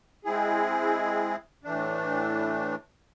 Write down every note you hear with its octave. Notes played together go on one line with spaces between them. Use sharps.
G#3 C4 E4 G#4
A2 E3 A3 D4